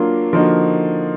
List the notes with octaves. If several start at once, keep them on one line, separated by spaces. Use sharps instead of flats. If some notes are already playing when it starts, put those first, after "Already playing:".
Already playing: F#3 A#3 D4 F4
D3 F3 A#3 D#4 F#4